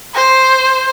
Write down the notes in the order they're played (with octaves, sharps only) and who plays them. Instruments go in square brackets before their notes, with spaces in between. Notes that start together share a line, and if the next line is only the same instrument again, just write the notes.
[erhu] C5